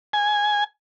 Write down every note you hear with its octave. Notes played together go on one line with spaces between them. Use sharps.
G#5